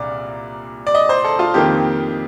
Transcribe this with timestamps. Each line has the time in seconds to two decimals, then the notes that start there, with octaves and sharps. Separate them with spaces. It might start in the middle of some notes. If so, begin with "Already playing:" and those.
Already playing: C2 A#2 D5
0.87 D5
0.95 D#5
1.09 C5
1.24 A4
1.39 F4
1.54 F2 D#3 A#3 G4